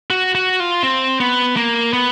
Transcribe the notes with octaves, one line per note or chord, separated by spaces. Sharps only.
F#4
F#4
F4
C4
B3
A#3
B3